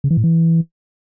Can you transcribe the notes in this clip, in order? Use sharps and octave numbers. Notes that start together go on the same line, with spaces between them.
C#3
E3
A2
E3